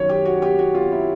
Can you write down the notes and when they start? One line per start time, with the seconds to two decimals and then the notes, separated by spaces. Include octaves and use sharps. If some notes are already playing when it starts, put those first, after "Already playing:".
Already playing: F#2 D#3 C#5
0.09 G4
0.25 F#4
0.42 G4
0.59 F#4
0.74 F4
0.92 E4